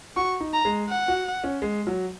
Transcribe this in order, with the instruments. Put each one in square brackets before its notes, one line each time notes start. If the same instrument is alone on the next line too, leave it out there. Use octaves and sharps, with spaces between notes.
[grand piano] F#4 [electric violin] C#6
[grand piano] D#4
[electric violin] A#5
[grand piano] G#3
[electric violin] F#5
[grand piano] F#4
C#4
G#3
F#3